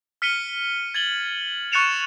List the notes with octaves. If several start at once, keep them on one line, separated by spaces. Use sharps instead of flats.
F6 B6 C#7 D#7 G7
G#6 A6 F#7 G7
C#6 F#6 A6 C#7 E7 F7